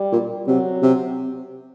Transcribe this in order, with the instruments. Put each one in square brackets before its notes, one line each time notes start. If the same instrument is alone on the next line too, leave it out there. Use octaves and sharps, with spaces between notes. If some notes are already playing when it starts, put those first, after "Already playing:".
Already playing: [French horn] G3
[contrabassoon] A#2
[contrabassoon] C3 [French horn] F#3
[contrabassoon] C3